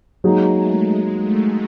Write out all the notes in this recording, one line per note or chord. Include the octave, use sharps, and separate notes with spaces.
F#3 G#3 A#3 D#4 G#4
A3
G#3
A3